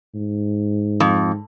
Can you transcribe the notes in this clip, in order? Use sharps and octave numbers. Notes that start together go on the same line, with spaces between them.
G#2
F2